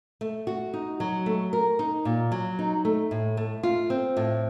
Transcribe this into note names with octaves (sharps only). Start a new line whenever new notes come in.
A3
F#4
D#4
F#3
A3
A#4
D#4
A#2
F#3
D#4
A3
A2
A3
F4
C4
A2